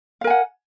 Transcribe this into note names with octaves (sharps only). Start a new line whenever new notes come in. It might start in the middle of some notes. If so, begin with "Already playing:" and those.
A#4 F5 F#5 G#5